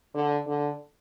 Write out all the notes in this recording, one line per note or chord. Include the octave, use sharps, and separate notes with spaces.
D3
D3